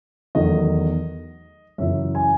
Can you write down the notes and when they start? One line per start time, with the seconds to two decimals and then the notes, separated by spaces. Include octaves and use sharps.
0.35 E2 D#3 F#3 A3 D#5
1.78 F#2 C#3 E3 E5
2.15 G#5